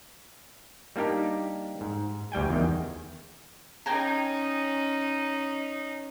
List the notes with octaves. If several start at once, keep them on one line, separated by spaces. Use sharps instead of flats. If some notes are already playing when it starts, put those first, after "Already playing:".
G3 A#3 D4 D#4 G4
G#2
D2 G3 G5 G#5
E2 D#3
C#4 D#4 G5 G#5 A#5